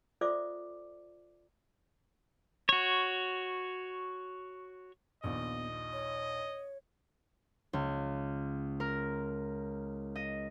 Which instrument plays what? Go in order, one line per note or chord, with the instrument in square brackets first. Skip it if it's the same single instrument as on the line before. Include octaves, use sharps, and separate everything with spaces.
[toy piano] F4 A4 C5 D5 E5 D6
[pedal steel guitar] F#4 C#5
[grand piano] A#1 D#2 D5 [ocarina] B3 [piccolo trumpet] D#5
[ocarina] C#5
[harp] C#2
A#4
D#5